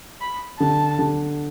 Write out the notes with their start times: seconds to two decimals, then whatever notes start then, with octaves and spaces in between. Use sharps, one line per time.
0.21 B5
0.59 D3 A5
0.99 D3